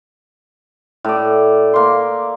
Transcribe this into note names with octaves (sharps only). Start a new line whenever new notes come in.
A2 D5
A#3 C6